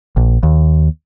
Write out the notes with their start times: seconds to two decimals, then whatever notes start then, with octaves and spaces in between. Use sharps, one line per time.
0.17 A#1
0.43 D#2